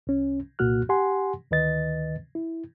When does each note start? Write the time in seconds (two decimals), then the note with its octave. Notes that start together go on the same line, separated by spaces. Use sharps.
0.07 C2 C#4
0.59 C2 A#2 A#3 F#4 F6 F#6
0.89 G4 F#5 G#5 C6
1.51 D2 D#3 B4 D#5 A6
2.35 E4